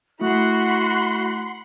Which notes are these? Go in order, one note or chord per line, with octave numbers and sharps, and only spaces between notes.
A3 E4 F#4 F#5 B5 C6